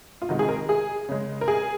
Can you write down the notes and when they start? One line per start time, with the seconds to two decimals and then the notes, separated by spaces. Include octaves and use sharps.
0.22 F4
0.29 C3 D#3 G#3 F#4
0.39 G#4
0.49 A#4
0.69 G#4
1.09 C#3 G#3
1.41 A#4
1.48 G#4